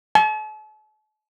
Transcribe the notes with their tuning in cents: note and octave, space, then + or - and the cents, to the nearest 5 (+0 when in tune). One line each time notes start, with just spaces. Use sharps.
A5 -45